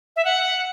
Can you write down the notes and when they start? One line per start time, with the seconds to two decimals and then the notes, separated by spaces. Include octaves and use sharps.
0.16 E5
0.25 F#5